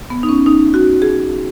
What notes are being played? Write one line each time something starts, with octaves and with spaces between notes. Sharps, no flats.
B3
D#4
C#4
D#4
F#4
G#4